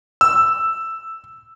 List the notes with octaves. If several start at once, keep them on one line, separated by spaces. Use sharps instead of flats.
E6